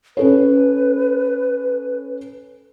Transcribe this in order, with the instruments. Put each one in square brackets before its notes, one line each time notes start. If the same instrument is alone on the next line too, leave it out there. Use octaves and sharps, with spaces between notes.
[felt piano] C#4 A4 C#5 [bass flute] B4